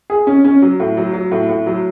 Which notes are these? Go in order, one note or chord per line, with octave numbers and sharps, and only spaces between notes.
G#4
C#4
C#4
F#3
A2
F#3
F#3
A2
A2
F#3